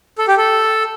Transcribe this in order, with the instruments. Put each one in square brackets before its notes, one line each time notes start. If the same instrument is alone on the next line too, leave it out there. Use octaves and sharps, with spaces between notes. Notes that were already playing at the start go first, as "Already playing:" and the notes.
[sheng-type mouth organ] A4
G4
A4